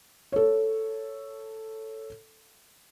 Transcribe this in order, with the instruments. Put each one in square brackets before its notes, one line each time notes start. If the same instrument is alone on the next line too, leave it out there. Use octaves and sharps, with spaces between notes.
[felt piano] A4 C#5